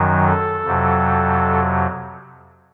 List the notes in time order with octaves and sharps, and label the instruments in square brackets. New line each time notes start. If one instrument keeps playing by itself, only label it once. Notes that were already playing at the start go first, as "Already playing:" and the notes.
Already playing: [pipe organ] F#2 D#3 F#3
A4
F2 C3 F#3